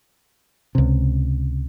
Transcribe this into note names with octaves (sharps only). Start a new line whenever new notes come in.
C#2 C3